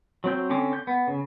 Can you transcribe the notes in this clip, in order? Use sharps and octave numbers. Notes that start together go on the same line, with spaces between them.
F#3 C4 G6
D3 C4 C#4 D6
G6
B3
C#3